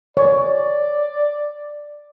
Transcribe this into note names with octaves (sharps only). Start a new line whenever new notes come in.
C#5 D5